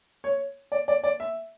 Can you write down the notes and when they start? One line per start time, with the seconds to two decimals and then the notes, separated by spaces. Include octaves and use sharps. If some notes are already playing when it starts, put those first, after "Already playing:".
0.24 C#5
0.72 D5
0.88 D5
1.04 D5
1.20 E5